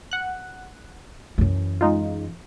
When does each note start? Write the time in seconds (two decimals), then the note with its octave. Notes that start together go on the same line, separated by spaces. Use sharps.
0.11 F#5 F#6
1.38 F#2 E3
1.81 G#3 D#4 F4